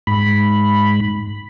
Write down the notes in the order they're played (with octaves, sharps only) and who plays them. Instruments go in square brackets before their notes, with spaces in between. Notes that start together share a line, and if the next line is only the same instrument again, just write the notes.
[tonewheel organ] G#2 B5